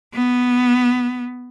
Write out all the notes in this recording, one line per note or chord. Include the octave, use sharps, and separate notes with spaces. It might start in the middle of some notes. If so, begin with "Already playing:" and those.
B3